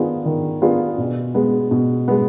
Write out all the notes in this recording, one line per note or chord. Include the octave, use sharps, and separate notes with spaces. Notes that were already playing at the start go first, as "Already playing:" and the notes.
Already playing: D#3 B3 D4 F4 G#4
D#3
B3 D4 F4 G#4
B2
G#3 B3
B2
G#3 B3